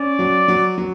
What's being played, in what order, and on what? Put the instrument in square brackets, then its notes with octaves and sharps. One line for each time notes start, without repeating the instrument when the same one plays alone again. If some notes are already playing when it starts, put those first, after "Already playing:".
Already playing: [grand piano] C#4 [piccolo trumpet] D5
[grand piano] F#3
F#3
F#3